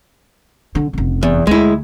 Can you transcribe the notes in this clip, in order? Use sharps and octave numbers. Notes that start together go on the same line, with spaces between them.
D3
F1 C#3
E2
D2 G#3 E4